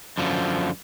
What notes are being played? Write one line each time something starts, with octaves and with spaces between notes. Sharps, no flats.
F#2 D3 F3